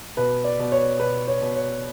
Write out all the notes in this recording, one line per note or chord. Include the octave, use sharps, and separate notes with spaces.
B2 B4
D5
B2
C#5
B2 B4
C#5
B2
C#5